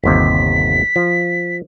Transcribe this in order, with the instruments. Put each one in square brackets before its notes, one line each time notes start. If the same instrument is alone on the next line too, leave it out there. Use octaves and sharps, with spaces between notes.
[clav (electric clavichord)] G1 D#2 C3 [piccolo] B6
[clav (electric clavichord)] F3